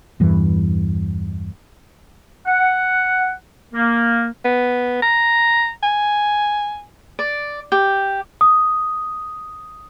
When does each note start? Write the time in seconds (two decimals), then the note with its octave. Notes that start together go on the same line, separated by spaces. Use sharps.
0.20 E2 G2 E3
2.45 F#5
3.73 A#3
4.45 B3
5.02 A#5
5.83 G#5
7.19 D5
7.72 G4
8.41 D#6